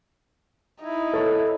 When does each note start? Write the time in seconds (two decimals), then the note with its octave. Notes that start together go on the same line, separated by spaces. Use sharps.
0.82 D#4 E4
1.13 A4 C#5